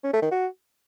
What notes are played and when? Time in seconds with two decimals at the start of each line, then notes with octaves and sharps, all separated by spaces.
0.04 C#4
0.13 A3
0.22 D#3
0.31 F#4